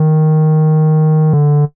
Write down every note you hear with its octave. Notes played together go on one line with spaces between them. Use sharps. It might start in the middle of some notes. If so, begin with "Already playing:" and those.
Already playing: D#3
D3